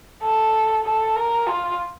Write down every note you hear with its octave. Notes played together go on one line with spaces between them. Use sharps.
A4
A4
A#4
F4